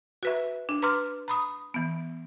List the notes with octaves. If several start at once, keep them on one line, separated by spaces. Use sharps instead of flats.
F#4 B4 E5
D4
B4 A#5 C6 D6 F6
A#5 B5 D#6
E3 B3